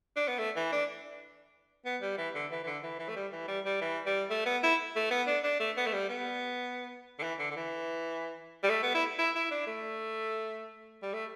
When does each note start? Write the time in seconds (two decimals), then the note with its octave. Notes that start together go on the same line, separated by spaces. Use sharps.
0.16 D4
0.28 B3
0.39 A3
0.56 E3
0.72 D4
1.85 B3
2.02 G3
2.18 E3
2.35 D3
2.51 E3
2.64 E3
2.67 D3
2.83 E3
2.99 E3
3.09 A3
3.16 G3
3.32 E3
3.48 G3
3.65 G3
3.81 E3
4.06 G3
4.30 A3
4.46 B3
4.63 E4
4.96 A3
5.11 B3
5.27 D4
5.44 D4
5.60 A3
5.77 B3
5.86 A3
5.93 G3
6.09 B3
7.19 D3
7.23 E3
7.39 D3
7.51 D3
7.56 E3
8.63 G3
8.69 A3
8.82 B3
8.95 E4
9.19 E4
9.35 E4
9.51 D4
9.67 A3
11.02 G3
11.13 A3